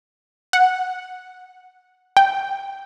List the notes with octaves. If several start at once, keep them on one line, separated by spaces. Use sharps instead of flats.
F#5
G5